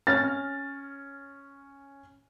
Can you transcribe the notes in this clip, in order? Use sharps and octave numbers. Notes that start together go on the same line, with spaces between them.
C#4 F6 A6